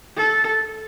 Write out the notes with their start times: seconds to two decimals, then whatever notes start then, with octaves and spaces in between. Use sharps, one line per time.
0.17 A4